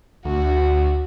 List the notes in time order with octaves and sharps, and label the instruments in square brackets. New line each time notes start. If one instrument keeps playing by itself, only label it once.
[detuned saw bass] D2 [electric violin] F#4